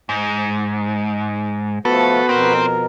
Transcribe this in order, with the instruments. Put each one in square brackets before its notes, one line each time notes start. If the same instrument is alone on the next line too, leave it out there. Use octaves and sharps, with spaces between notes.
[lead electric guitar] G#2
[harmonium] F3 A3 [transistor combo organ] B3 F#4 B4 [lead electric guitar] A4
[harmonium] F2 B2 A#4 [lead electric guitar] C4 C5